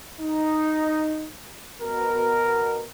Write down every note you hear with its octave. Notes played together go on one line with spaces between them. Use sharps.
D#4
B2 A#4